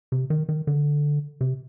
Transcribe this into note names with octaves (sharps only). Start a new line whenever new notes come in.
C3
D#3
D#3
D3
C3